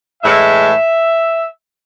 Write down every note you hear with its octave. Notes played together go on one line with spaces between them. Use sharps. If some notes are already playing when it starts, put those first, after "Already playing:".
A2 E3 G#3 E5